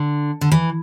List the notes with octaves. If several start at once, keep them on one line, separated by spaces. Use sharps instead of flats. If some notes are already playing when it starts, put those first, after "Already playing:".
Already playing: D3
D3
E3